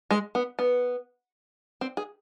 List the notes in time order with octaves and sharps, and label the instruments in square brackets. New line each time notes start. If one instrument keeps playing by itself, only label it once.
[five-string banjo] G#3
B3
B3
C4
G#4